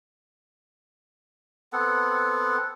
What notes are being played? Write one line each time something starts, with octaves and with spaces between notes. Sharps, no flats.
B3 C4 A4 F#5